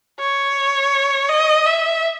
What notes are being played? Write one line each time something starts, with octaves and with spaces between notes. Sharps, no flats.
C#5
D#5
E5